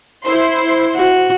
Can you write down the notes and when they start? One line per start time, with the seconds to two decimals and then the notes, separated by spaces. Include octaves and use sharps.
0.24 E4 C5 C6
0.96 F#4